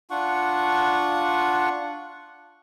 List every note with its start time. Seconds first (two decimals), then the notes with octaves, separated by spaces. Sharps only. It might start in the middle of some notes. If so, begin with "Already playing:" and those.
0.10 D4 F4 F#5 C#6